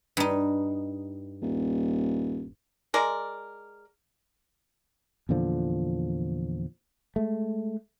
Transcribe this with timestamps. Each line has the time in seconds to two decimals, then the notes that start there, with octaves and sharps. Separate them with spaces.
0.17 G2 D#4
1.42 D#1
2.94 G#3 A#4 D5
5.29 E2 A#2 D3 F3
7.16 G#3 A3